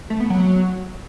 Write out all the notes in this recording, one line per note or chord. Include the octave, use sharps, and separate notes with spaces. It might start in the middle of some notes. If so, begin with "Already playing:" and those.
A3
B3
F#3